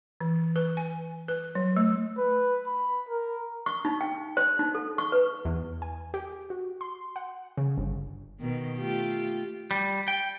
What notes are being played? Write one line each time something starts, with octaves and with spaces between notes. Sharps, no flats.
E3
B4
G#5
B4
F#3
A3
B4
B5
A#4
C#6
D#4
G5
C5
D#4
A4
C#6
B4
E2
G#5
G4
F#4
C6
F#5
C#3
G1
B2 D#3
A3 F4 G4
G3
G5